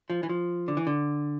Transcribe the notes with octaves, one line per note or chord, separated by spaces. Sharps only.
F3
E3
F3
D3
E3
D3